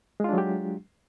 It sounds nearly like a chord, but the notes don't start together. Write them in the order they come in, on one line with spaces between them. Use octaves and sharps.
G#3 F4 D4 F#3 G4